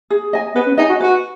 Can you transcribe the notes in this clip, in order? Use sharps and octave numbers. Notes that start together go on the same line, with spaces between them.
G#4
D#5 G#5
B3 B4
C#4
D#4 D#5 G#5
F#4
F#4 B4